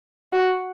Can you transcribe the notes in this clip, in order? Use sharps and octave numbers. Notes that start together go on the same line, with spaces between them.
F#4